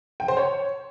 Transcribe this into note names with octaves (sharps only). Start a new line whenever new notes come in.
G5
C5
C#5